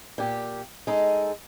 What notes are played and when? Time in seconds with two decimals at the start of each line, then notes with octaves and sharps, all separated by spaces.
0.18 A#2 G4
0.87 G#3 D#4 A4